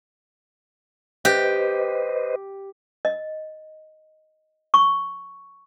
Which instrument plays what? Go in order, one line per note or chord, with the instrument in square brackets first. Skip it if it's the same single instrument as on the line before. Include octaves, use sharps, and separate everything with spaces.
[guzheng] G4 [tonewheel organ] B4 C5 D#5
[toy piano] D#5
C#6